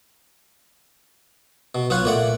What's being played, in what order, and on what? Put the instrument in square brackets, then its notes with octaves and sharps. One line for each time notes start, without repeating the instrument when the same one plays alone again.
[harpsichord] B2
[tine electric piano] B1 F#6 [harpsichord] B3 F4 C#5
[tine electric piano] A#2 A3 [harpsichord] A#3 D5 F#5